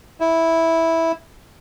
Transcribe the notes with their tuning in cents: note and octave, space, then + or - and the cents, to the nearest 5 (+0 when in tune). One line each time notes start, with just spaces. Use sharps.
E4 -10